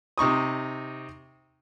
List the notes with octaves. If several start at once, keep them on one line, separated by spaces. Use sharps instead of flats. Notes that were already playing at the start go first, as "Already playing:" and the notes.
C3 D#4 C#6 D#6